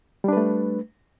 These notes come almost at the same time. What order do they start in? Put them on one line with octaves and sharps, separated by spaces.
G3 D4 B4 A3